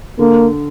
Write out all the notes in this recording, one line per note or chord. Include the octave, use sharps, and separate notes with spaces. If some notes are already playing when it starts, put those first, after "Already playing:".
D3 A#3